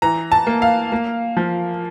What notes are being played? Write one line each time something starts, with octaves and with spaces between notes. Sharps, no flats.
E3 A#5
A5
A#3
F5
A#3
F3